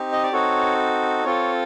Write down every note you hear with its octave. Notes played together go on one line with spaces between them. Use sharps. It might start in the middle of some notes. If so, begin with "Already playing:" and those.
Already playing: C4 D#4 G4
D#5
D5
C4 D#4 F#4 A4 C#5
C4 F4 A4 C#5